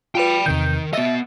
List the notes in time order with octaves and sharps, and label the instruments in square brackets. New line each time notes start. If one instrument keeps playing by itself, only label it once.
[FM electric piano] F4 B4 [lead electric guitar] G5 B5
[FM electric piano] E2 C3 G6 [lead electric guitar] D#3
[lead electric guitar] B3 D#5 [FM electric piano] E5 A6